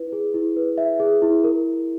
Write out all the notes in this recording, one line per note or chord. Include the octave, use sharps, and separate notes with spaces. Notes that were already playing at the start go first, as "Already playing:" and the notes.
Already playing: E4 B4
G#4
E4
B4
E5
G#4
E4
A#4